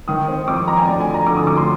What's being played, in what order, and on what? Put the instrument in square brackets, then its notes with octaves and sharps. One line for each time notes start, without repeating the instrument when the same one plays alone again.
[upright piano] D#3 D#6
C4
F2 D6
F2 A#5
G#5
D2 D5
G#5
F3
A#5
D3 D6
D#6
D2 D6
C6